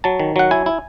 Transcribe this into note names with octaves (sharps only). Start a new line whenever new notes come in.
F#3 A5
D#3
F#3 F#5
E4 G#5
E4